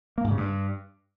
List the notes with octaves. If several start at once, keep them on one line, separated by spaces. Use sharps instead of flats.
A#3
G#2
C#3
G2